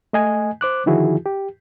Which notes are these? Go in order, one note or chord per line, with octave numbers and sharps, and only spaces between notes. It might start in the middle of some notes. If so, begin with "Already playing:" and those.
A3 D#5 G#5
C5 D6 F#6
D3 D#3 F3 E4 F#4 G#4
G4